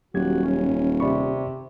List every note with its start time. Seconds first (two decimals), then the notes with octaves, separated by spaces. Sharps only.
0.14 D#1 F#3 F#4 G4 G#6
0.45 C#4
1.00 C3 D5 B5 C#6